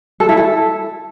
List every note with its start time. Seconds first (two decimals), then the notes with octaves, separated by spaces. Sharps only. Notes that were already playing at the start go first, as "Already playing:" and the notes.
0.20 A4
0.29 E4
0.37 A4